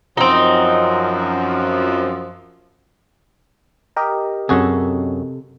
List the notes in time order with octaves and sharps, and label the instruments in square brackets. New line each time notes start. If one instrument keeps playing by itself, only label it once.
[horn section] F#2 F3 [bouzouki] C4 D#4
[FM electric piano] G4 A#4 D#5
[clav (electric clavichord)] F#2 F#4 G#4 [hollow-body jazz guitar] C3 A4